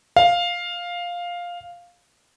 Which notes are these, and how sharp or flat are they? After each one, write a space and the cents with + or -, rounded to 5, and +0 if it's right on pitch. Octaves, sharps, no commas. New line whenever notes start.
F5 +5